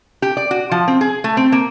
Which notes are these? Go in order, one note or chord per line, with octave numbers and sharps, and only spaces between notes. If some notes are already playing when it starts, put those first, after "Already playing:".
G4
D5
F#4
F3
C4
G#4
A3
C4
A#3